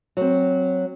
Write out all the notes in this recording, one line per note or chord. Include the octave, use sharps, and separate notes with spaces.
F#3 C4